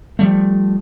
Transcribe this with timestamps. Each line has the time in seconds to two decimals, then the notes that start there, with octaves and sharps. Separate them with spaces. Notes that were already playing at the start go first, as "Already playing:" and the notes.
0.19 F3 G3 A3